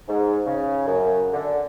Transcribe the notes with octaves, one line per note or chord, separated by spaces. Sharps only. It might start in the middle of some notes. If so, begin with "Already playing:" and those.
G#2
C#3
F#2
D3